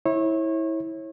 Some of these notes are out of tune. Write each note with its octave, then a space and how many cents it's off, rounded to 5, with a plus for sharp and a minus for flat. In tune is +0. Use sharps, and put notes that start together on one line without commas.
E4 -20 C#5 -30